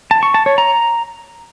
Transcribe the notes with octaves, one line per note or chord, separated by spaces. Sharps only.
A5
C#6
A5
C#5
A#5